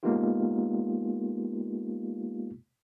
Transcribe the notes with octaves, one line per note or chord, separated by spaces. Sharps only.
G#3 A#3 B3 D#4 F4 G4